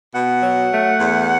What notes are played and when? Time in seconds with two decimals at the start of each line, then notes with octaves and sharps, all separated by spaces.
0.14 B2 F#5
0.43 F#3
0.71 A3
1.00 E2